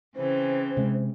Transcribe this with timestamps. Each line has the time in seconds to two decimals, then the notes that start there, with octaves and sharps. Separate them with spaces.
0.16 C#3 E3 C4 C5
0.77 C3 G#3